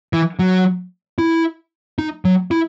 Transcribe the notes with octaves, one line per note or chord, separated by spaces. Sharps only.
E3
F#3
E4
D#4
F#3
E4